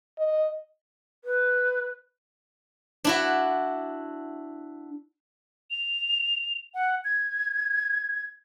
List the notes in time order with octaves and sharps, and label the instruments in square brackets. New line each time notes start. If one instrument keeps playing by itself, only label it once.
[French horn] D#5
[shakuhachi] B4
[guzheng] D4 E4 F#4
[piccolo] F7
F#5
G#6